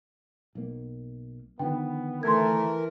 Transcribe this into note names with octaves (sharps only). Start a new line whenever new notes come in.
B1 A#3
D3 D#3 F3 B3 G5
E3 A3 A#4 C6 G#6